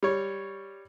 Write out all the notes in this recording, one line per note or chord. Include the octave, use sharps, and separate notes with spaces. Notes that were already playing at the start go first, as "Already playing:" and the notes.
G3 C#5